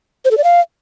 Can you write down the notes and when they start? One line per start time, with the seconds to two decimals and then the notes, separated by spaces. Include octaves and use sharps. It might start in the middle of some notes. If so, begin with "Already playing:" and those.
0.25 C5
0.31 A4
0.38 D5
0.44 F5